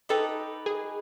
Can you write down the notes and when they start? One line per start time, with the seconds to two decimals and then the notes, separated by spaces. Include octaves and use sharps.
0.09 D#4 G4 A4 B4 D#5
0.66 G#4